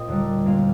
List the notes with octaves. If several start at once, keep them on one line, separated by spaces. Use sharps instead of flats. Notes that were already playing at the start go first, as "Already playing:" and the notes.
Already playing: A#2 C4 D#5
D#2 D3 G3
A#2 G#3 C4 F5